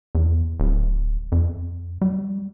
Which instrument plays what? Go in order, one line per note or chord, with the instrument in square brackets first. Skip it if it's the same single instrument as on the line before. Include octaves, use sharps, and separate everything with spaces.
[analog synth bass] E2
D1
F2
G3